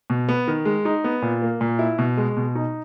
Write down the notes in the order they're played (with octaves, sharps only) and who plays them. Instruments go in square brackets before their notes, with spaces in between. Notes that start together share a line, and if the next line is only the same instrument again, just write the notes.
[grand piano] B2
B3
D#3
G#3
D#4
B3
A#2
A#3
A#2
E4
B2
G#3
B2
D#4